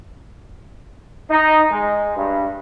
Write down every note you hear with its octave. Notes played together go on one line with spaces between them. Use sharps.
D#4
G#3
G2